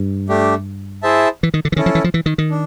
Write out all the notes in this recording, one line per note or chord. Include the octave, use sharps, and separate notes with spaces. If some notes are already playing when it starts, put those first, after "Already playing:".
Already playing: G2
A3 D4 G4
E4 G#4 C5 E5 A5
E3
D#3
D3
E3
D#3 C#4 E4 A4
F3
E3
F3
E3
D#3
D#3
D4